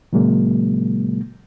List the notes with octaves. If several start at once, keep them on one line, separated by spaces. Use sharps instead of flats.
A#2 C#3 F#3 G#3 A#3